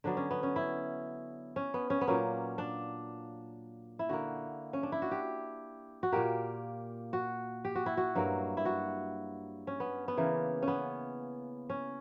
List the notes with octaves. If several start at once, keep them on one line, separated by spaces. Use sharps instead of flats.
D3 F#3 B3 D4
C#4
B3
C#4
E4
C#4
B3
C#4
B3
A#2 F#3 A#3 C#4
D4
E4
D3 A#3 F#4
C#4
D4
E4
F#4
G4
F#4
A#2 A#3 G4
F#4
G4
F#4
E4
F#4
G2 F#3 A#3
E4
F#4
C#4
B3
B3
C#3 E3 A#3
C#4
B3
C#4